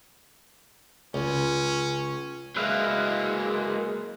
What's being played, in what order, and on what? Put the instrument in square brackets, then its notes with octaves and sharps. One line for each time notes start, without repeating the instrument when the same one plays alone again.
[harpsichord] C#2 [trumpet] C#4
[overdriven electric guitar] F#3 A#3 [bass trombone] G#3 [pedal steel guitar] B4 E5 F5